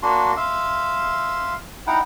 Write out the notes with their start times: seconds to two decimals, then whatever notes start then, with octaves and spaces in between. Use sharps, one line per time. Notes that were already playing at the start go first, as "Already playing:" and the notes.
0.03 A#3 D4 F#4 C6
0.37 E5 F5 C6 E6
1.87 D#4 E4 F#5 G5